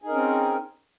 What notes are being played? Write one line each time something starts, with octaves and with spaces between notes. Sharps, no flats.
C4 C#4 D#4 G#4 A#4